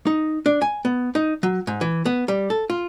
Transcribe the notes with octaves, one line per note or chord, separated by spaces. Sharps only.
D#4
D4
G#5
B3
D#4
F#3
G#2
E3
B3
G3
A4
F4